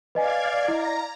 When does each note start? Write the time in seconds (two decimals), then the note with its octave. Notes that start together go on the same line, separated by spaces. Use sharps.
0.15 B4 D5 D#5 F5 G#5 G#6
0.68 E4 D#5 A#5